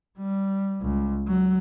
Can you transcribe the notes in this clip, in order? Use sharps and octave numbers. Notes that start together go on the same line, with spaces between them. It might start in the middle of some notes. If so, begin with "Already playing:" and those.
G3
C#2
F#3